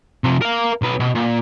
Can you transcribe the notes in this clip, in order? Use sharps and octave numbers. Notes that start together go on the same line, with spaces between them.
C3 F3
A#4 F5
B1 B4
B2
A#2